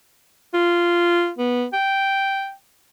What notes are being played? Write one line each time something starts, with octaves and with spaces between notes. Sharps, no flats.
F4
B3
G5